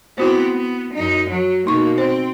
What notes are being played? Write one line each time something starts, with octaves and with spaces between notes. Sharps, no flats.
B3 C4 E4 F#4 C5
B3
F#2 D#4
F#3
B2 A#3 D#4 C#6
C4 C5